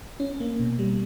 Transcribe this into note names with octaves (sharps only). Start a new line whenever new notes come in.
C#4
A#3
B2
G3